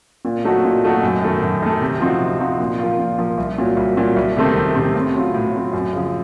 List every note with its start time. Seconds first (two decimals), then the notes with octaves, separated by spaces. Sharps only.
0.25 A#2
0.44 F#3 A3 D#4 F#4
0.64 A#2
0.83 F#3 A3 D#4 F#4
1.03 F#2
1.22 D#3 A3
1.42 F#2
1.62 D#3 A3
1.81 C3
2.00 F3 C4 D#4 F#4
2.20 C3
2.40 F3 C4 D#4 F#4
2.60 A#2
2.79 F3 A#3 F4
2.99 A#2
3.18 F3 A#3 F4
3.38 C2
3.58 A#2 F#3
3.77 C2
3.97 A#2 F#3
4.16 C2
4.36 C3 D#3 A3 C4
4.56 C2
4.75 C3 D#3 A3 C4
4.95 A2
5.14 F#3 C4 F4
5.34 A2
5.54 F#3 C4 F4
5.73 F#2
5.93 C#3 F3